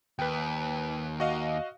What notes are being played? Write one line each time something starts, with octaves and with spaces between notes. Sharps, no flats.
D#2 B4 G5
F#4 D#5 F5